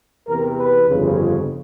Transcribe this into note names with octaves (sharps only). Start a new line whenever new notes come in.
E2 C3 E3 A#4
B4
G1 F2 C#3